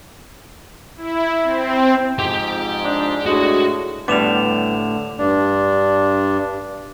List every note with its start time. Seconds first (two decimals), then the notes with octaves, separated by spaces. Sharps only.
0.97 E4
1.44 C4
2.19 F2 G#2 G4 G5
2.84 D4
3.26 A2 G#3 D4 F#4
4.08 A2 D3 G3 B3 D6 E7 F7
5.19 G2 D4